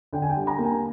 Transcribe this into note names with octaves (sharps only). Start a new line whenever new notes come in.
D3 G5
G#5
G5
G3
A#5
A#3
G#5